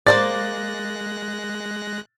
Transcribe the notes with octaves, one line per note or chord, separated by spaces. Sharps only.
G#3 A#3 C5 D5 F#6 A6 A#6